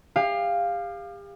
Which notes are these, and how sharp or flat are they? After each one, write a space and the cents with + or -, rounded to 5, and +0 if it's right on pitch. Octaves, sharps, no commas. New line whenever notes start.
G4 +40 F5 +0